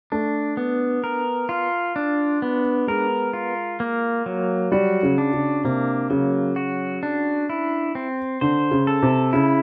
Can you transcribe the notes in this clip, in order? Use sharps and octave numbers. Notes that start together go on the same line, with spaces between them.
A3 D4
B3
A#4
F4
D4
B3
G#3 A#4
F4
A#3
F#3
G3 F#4
C#3
D4
C#3
C3 A#3
C#3 F#3
F#4
D4
E4
C4
D3 C5
C#3
A4
C3
C#3 E4